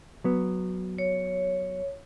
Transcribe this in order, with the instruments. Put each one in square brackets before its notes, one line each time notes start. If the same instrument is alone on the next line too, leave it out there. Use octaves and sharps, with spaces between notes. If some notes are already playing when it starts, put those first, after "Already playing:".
[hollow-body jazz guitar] F#3 B3
[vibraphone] C#5